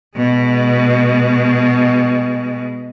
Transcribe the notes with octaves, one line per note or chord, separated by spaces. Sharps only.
B2 G#3